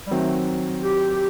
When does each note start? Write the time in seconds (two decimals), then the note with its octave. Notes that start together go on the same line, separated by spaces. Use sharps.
0.06 G3
0.11 D#3 F#3 A3 C4
0.83 G4